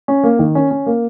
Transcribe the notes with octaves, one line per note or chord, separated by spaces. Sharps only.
C#4
A#3
D#3
C#4
C#4
A#3